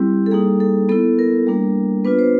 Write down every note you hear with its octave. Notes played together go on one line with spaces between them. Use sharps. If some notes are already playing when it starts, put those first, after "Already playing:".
Already playing: G3 C4 E4 G4
A4
G3 A#3 D#4 G#4
A4
B3 E4 A4
A#4
G3 A#3 D4
B3 D4 F4 B4
C5